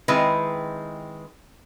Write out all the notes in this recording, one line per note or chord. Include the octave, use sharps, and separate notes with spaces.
D#3 G#3 C4 E4 B4